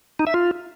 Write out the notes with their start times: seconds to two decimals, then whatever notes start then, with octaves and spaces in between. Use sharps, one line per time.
0.19 D#4
0.27 E5
0.34 F4